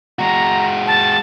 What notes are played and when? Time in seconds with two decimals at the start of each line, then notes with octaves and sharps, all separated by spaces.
0.19 G#3 F#4 A#5
0.87 A5